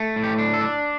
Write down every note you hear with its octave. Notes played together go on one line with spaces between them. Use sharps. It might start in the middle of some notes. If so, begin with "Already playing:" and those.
Already playing: A3
A2
G4
D4
A4
D4